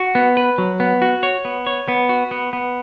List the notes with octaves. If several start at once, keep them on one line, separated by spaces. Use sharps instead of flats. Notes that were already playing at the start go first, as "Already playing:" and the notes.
Already playing: F#4
B3
B4
F#3
B3
F#4
C#5
B3
C#5
B3
F#4
B3
B3